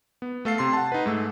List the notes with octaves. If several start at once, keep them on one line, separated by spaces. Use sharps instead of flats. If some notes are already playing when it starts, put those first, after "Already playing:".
B3
A3 A4 F5 C7
C3 C6 C7
F#5 A5
D#4 B4
G#2 A3 E6